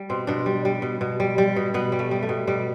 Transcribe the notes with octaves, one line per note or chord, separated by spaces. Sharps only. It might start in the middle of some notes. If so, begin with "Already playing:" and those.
Already playing: G3
B2 C4
B2 D4
G3
G3
B2
B2
G3
G3
B2
B2 B3
G3
A3
G3
A3
B2
B2 G3